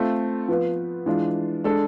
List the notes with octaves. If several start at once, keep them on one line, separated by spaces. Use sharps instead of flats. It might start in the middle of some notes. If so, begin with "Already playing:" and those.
Already playing: A3 C4 F4 A4
F3 B3 F4 B4
E3 G#3 D4 F4
G#3 D4 A4